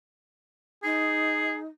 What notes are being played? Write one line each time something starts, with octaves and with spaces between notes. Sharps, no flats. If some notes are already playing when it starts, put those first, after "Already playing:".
D#4 G#4